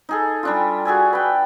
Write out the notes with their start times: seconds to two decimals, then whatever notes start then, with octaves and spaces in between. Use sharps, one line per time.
0.09 D#4 G#4 A4
0.43 G3 D4 F4
0.85 F#4 G#4 E5 G#5
1.13 B4 G5